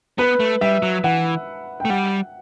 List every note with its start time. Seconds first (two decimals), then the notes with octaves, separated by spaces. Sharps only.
0.18 B3 B4
0.40 A3
0.61 G3 E5
0.83 F#3
1.04 E3 F#5
1.80 G5
1.85 A3
1.90 G3 F#5